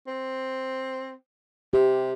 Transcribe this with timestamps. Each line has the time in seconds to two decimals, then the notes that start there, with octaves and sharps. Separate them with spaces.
0.07 C4
1.73 C3 G4